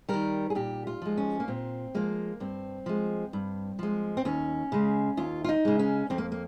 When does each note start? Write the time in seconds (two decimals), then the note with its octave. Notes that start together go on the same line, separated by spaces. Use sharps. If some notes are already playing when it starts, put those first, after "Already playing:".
0.09 D#3 G3 A#4
0.50 G#4
0.55 A#2 G4
0.87 F4
1.02 F3 G#3
1.17 C#4
1.40 A#3
1.48 A#2 C4
1.95 F3 G#3 A#3
2.40 G2 C4
2.86 F3 G#3
3.33 G2
3.79 F3 G#3
4.17 C4
4.25 D#2 C#4
4.72 C#3 G#3
5.17 D#2 F4
5.44 F4
5.49 D#4
5.65 C#3 G#3
5.79 C#4
6.10 F2 C4
6.18 A#3
6.32 A#3